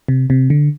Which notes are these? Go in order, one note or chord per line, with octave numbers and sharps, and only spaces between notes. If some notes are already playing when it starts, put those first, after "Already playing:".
C3
C3
D3